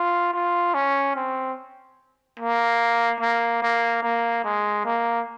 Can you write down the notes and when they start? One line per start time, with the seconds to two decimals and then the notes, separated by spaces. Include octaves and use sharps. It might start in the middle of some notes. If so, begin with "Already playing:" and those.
Already playing: F4
0.34 F4
0.74 C#4
1.16 C4
2.40 A#3
3.21 A#3
3.63 A#3
4.03 A#3
4.44 G#3
4.85 A#3